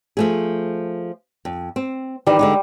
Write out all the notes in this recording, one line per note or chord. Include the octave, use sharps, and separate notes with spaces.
F3 A3 G#4
F2
C4
D#3 E3 G3
D3 G#3 D#4